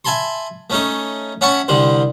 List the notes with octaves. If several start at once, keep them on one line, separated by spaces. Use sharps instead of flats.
E5 G#5 A5 B5 C6
A3 C#4 D#4 A4
C#4 E5 F#5 A5 B5 C#6
C2 D3 G3 C5